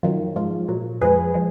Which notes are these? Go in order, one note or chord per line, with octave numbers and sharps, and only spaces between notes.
F#2 D#3 F#3 F4
G#2 F3 G#3 F4
A#2 F#3
F2 F3 G#3 G#4 B4
F3 G#3